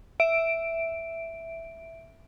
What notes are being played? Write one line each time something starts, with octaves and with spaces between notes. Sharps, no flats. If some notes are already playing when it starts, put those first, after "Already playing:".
E5 D7